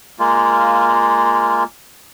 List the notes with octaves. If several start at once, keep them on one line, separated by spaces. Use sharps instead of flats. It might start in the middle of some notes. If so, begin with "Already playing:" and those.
G#3 A#3 F4